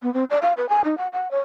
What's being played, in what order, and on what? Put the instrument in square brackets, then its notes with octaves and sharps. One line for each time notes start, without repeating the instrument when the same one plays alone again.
[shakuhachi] B3
C4
D5
F5
B4
G#5
D#4
F#5
F#5
C#5